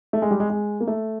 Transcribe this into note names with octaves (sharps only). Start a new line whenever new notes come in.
A3
G#3
G3
G#3
G#3
A#3
A3